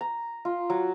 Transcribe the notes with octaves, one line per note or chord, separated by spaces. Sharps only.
A#5
F4
F#3